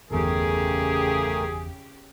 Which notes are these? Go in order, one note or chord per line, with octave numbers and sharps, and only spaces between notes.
G1 E2 C#3 A3 G4 G#4 A#4